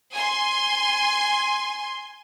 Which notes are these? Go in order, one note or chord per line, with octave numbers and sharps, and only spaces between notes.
G#5 C6